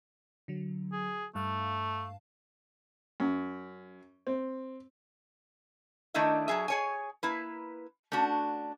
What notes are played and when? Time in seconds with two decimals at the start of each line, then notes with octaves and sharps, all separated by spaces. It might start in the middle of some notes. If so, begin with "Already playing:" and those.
0.48 D3 F#3
0.92 G#4
1.35 G2 A3 F5 A5
3.20 F#2
4.27 C4
6.14 D#3 A3 D4 E4 D#5 E5
6.48 F#3 G#3 G#4 E5
6.68 G#4 C#5 G#5
7.23 A#3 E4 B4
8.12 A3 C#4 D4 F#4